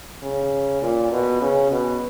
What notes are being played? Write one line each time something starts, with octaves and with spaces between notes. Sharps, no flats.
C#3
A#2
B2
C#3
B2